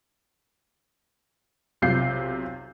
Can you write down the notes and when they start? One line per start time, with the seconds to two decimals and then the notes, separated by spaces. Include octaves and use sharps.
1.82 B1 C3 F4 G6 C7